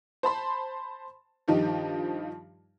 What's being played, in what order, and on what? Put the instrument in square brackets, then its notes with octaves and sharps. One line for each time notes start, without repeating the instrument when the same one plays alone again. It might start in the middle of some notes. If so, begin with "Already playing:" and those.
[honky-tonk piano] C5 A5 B5 C6
G2 D#3 F3 D#4 G4